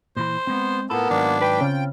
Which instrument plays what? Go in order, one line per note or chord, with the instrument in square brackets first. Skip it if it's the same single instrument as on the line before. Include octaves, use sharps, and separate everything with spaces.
[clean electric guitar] A#2 E3 B5 [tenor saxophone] C5
[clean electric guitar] G#3 C4 [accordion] B3
[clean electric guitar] A2 F4 B5 [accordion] A#3 B3 [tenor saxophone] A4
[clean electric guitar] G#2 D#3 F#3 [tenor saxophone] D4
[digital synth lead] B4 [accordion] G5
[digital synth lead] C#3 [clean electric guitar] C4 F4